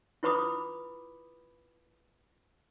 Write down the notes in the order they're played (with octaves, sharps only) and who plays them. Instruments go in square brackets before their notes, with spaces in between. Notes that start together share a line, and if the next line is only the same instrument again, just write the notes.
[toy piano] E4 F4 B4 B5 D6 D#6